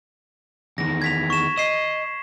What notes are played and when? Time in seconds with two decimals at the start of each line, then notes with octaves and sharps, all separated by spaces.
0.78 E2 D#3 A#6
1.02 G#6 B6 F7
1.30 C#6 E7
1.57 D#5 C7 E7